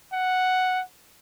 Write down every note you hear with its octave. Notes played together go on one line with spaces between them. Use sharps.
F#5